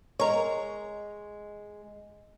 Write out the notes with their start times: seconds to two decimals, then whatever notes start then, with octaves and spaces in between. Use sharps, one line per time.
0.19 G#3 A#4 C#5